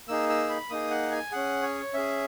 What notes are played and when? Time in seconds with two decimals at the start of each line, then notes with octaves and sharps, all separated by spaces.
0.08 A#3 D#4 G#4 E6
0.29 E6
0.49 B5
0.70 A#3 D#4 G#4 D#6
0.91 F#5
1.11 G#5
1.32 C#4 G#4 F#5
1.63 C#5
1.94 C#4 G#4 E5